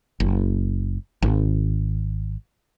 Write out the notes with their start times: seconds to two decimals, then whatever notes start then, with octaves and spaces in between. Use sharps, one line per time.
0.20 F#1
1.22 G#1